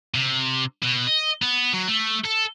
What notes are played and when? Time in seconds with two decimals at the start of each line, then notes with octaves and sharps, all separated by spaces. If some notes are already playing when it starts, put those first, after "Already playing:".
0.14 C3
0.82 B2
1.07 D#5
1.42 B3
1.73 F#3
1.88 A3
2.24 A4